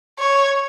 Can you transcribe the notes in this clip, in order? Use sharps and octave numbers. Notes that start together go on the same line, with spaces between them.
C#5